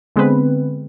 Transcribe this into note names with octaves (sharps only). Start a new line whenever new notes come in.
D3 G#3 B3 C4 B4